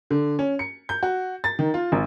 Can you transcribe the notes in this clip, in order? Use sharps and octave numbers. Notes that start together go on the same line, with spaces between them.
D3
C#4
C#7
G6
F#4
A6
D#3
F4
G#1